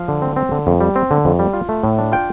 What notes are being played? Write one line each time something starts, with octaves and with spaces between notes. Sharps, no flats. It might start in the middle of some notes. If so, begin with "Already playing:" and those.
Already playing: F3 F5
D3
C4
C4
D3
F2
G3
C4
D3
F2
G3
F4
A3
A2
D4
F4 G5